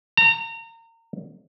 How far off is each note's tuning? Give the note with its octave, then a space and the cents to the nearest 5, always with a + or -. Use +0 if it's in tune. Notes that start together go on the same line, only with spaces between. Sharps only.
A#5 -30